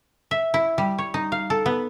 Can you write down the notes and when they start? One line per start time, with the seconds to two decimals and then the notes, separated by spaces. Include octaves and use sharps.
0.31 E5
0.54 E4
0.78 G3
0.98 C#5
1.14 D#4
1.32 F5
1.50 A4
1.66 B3